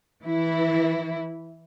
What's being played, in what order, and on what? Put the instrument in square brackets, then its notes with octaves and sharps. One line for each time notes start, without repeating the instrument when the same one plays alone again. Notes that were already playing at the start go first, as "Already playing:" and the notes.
[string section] E3 E4